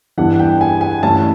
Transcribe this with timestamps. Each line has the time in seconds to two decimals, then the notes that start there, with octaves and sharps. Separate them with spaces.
0.17 G2 E3 G3 B3 D4 F#5
0.39 G5
0.61 G#5
0.81 G#5
1.02 G2 E3 A3 C#4 A5